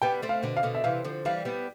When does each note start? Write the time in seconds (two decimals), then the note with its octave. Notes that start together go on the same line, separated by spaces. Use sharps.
0.02 G3 B3 G5
0.22 A3 C4
0.29 F5
0.43 B2 D3
0.57 F5
0.63 B2 D3
0.75 E5
0.84 C3 E3 F5
1.04 D3 F3
1.25 E3 G3 F5
1.45 G3 B3